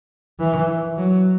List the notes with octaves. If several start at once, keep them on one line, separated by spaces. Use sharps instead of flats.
E3
F#3